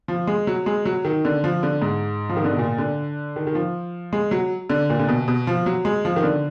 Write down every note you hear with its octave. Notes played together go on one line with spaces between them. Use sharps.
F3
G#3
F#3
G#3
F#3
D#3
D3
F3
D3
G#2
F3
D#3
D3
B2
A#2
D3
D#3
D#3
F3
G#3
F#3
D3
A#2
D3
B2
B2
F3
F#3
G#3
F3
D#3
D3